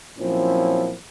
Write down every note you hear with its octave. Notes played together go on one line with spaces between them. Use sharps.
A#2 F3 F#3 C4 C#4 E4